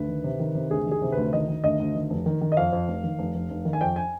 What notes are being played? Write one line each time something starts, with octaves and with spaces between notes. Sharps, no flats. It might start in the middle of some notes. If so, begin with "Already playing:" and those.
Already playing: D2 B4
D#3
C3
D#3
C3
D2 G#4
D#3 G#4
C3
D2 B4
D#3 D#5
D#3
D2 D#5
D2
D#3
F1
D#3
D#3
D#5
F2 F5
F2
F1
D#3
F1
F1
F1
D#3
G#5
F2 G5
G#5